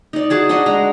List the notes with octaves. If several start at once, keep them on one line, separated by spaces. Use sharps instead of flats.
D#4 D5
F#4 G#4 A5
D4 F#4 D#5 F#5
G#3 A#5